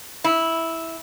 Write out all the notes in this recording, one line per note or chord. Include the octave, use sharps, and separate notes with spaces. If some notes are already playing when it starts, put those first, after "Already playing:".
E4